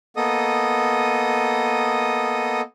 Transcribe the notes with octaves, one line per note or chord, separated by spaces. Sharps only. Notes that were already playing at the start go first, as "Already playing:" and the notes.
A#3 B3 A4 D#5 D#6